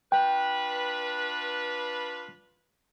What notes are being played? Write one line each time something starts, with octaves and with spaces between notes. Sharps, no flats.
D4 F4 B4 G5